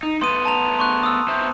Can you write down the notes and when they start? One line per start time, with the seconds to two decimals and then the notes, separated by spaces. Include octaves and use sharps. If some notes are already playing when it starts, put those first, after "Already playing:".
0.03 D#4
0.21 A3 B3 B4 C6 D#6 D#7
0.45 A5 A#5 F7
0.79 C6 C#6 F#6
1.03 D#6 E6
1.28 B3 C5 E5